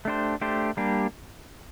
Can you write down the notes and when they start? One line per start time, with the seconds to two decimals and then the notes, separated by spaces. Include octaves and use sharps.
0.05 A3 D4 G4 C5
0.41 A3 D4 G4 C5
0.77 G3 A#3 D4 G4